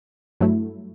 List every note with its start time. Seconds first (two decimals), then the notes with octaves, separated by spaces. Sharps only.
0.41 G2 F#3 A3 E4